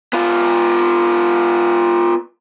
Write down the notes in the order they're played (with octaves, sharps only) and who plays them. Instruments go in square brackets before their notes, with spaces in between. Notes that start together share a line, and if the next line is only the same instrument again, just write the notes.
[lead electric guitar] B3 F4